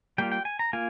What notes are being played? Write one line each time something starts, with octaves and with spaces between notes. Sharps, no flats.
G3 A#3 F4 G5
G5
G#5
A#5
A#3 F4 G#5